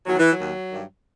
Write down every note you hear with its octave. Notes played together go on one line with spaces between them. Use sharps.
E2 D#3 F#3
E3
F#3
D#2 D#3
G2 D#3